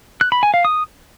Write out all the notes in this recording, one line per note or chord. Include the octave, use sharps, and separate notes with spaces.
F#6
B5
G#5
F5
D#6